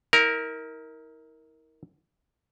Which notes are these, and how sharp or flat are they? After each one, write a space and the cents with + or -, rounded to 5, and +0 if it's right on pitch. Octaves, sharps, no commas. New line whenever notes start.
E4 -45 A#4 +0